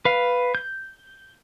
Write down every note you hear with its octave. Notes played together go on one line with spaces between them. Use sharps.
B4 F5
G6